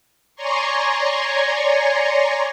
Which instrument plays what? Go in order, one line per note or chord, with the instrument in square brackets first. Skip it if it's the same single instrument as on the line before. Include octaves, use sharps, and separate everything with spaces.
[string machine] C#5 D5 G#5 A#5 C6 C#6